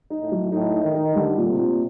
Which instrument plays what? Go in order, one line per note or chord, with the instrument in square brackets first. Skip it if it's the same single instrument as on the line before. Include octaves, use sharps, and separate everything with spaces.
[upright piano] D#4
[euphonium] A2
[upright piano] F#3
[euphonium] A2 [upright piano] D#4
[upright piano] D#4
[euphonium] D#3
[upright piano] D#4
[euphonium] D3 [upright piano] G3
[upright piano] A#2
[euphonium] C3
[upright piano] A#2